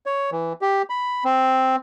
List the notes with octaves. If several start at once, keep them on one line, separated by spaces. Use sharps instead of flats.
C#5
E3
G4
B5
C4